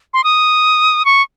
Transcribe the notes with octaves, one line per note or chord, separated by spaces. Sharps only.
C6
D#6
C#6